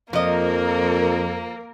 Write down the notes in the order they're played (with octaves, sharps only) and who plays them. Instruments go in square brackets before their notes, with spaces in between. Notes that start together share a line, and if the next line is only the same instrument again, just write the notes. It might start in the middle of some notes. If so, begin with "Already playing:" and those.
[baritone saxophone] F2 [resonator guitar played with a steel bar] F3 D#5 [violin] A#3 [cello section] A#4